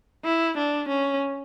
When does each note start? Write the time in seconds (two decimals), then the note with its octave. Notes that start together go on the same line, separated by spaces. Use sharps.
0.24 E4
0.57 D4
0.88 C#4